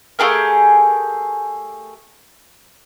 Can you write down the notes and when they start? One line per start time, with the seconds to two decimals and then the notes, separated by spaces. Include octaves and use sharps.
0.19 A3 G4 G#4 A#4